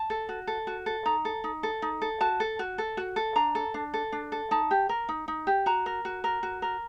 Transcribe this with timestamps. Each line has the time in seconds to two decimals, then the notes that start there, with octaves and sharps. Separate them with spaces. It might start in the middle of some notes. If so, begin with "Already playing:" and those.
Already playing: A5
0.10 A4
0.29 F#4
0.47 A4
0.67 F#4
0.86 A4
1.05 D#4 A#5
1.25 A4
1.44 D#4
1.63 A4
1.82 D#4
2.02 A4
2.21 F#4 A5
2.40 A4
2.59 F#4
2.78 A4
2.97 F#4
3.16 A4
3.36 D4 A#5
3.55 A4
3.74 D4
3.94 A4
4.12 D4
4.32 A4
4.51 D#4 A5
4.71 G4
4.89 A#4
5.09 D#4
5.28 D#4
5.47 G4
5.66 F#4 A#5
5.86 A#4
6.05 F#4
6.24 A#4
6.43 F#4
6.62 A#4